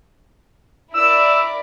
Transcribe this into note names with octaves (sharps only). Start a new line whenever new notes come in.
E4 A#4 D5 E6